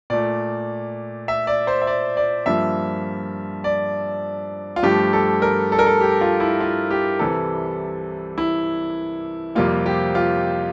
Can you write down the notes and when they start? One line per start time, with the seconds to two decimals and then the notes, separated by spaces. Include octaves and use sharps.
0.10 A#2 A3 D5
1.28 E5
1.47 D5
1.67 C5
1.82 E5
1.87 D5
2.17 D5
2.46 G2 F3 A#3 E5
3.64 D5
4.76 F4
4.83 G2 F3 A3 G4
5.13 A4
5.42 A#4
5.72 A4
5.79 A#4
5.86 A4
6.01 G4
6.21 F4
6.40 E4
6.60 F4
6.90 G4
7.19 C2 C3 E3 G3 A4
8.38 E4
9.55 F2 C3 G3 A#3 F4
9.86 G4
10.15 F4